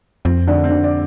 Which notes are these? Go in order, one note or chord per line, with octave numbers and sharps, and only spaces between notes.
F2 C4
D3 D4
C4
D3 D4
D5